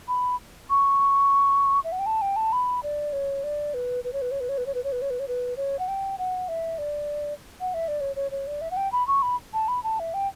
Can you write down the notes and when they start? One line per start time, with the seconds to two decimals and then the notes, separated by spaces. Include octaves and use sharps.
0.08 B5
0.70 C#6
1.84 E5
1.92 F#5
1.99 G5
2.06 A5
2.22 G5
2.36 A5
2.53 B5
2.83 D5
3.13 C#5
3.44 D5
3.74 B4
4.04 B4
4.13 C#5
4.22 B4
4.31 C#5
4.40 B4
4.49 C#5
4.58 B4
4.66 C#5
4.75 B4
4.84 C#5
4.92 B4
5.02 C#5
5.10 B4
5.20 C#5
5.28 B4
5.57 C#5
5.79 F#5
5.88 G5
6.18 F#5
6.48 E5
6.78 D5
7.61 F#5
7.74 E5
7.88 D5
8.01 C#5
8.16 C#5
8.31 C#5
8.47 D5
8.61 E5
8.71 F#5
8.77 G5
8.92 B5
9.08 C#6
9.22 B5
9.54 A5
9.68 B5
9.84 A5
10.00 E5
10.14 G5